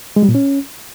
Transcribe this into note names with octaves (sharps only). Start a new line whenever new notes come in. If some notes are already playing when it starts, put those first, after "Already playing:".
G#3
G3
A#2
C#4